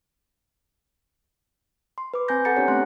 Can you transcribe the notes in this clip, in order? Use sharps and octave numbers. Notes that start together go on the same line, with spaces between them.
C6
B4 D6
C4 G#5 A#5 C6 G6 A#6
A4 F#5 A#5 C6 A6 C#7
B3 C#4 D4 G4 C#5
A3 C4 C6 F#6